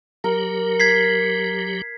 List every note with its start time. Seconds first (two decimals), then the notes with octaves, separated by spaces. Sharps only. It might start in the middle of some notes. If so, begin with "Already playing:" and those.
0.24 F#3 G4 A#4
0.80 G#6 B6 C7